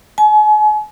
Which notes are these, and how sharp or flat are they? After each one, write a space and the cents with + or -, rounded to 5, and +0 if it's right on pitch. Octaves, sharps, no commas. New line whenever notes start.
G#5 +40